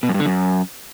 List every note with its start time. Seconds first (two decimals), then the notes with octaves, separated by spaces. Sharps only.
0.03 B2
0.09 F#2
0.14 G2
0.20 D3
0.26 F#2